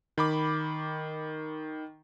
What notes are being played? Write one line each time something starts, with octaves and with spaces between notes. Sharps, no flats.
D#3 B5 D6